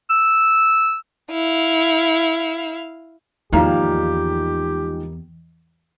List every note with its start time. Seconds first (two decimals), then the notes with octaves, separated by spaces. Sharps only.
0.10 E6
1.31 E4 F5
3.53 E2 G#2 D#3 F3 G3 A#3 G4 F5